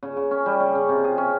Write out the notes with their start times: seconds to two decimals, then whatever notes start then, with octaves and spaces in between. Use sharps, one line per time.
0.03 C#3
0.17 C#3
0.31 C#4
0.46 G3
0.60 C#3
0.75 C#3
0.89 C3
1.04 G#4
1.18 C#4